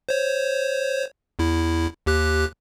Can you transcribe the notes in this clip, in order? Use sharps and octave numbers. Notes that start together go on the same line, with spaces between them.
C5 C#5
E2 E4
D#2 G4 F#6